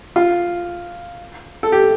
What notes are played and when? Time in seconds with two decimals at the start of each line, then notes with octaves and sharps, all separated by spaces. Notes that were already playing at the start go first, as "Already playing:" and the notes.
0.16 F4
1.63 A4
1.72 G4